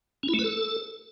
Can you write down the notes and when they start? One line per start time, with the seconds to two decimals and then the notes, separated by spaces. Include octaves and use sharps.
0.23 C#4
0.28 E4
0.34 A3
0.39 B4
0.44 A4